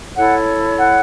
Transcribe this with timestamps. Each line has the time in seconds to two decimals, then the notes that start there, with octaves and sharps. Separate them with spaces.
0.15 E4 A4 C#5 F#5
0.77 F#5